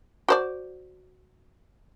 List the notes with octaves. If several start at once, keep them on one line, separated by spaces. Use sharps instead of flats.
F#4 C5 D5